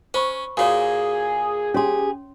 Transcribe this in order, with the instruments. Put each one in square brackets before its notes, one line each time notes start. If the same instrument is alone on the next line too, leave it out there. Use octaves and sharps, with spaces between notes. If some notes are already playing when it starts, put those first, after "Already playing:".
[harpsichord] C#4 [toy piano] C5 B5 C#6
[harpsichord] A#2 A#3 [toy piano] F#4 C#5 [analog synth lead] G#4
[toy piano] C#4 C#5 C6 [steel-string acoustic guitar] G4 G#4